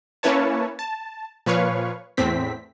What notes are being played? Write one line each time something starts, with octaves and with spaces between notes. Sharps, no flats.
A#3 C#4 E4 B4 C#5 A5
A5
A#2 F3 B4 C#5 F5 C#6
E2 A2 C4 B6